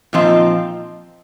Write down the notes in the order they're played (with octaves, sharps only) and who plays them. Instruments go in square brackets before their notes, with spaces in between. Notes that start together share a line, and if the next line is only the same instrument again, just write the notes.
[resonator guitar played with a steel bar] A#2 F3 C4 F4 [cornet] D#4